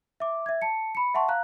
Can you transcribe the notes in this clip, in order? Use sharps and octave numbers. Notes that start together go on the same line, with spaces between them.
E5 D6
E5 G#6
A5 C#7
B5 C#7
E5 F#5 A5 C6 C#6
F5 A#5 F#6